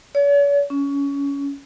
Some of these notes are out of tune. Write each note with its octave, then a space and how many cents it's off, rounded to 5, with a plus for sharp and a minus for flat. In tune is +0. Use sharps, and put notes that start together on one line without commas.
C#5 +45
C#4 +20